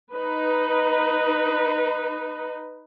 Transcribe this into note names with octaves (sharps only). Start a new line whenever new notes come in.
D#4 B4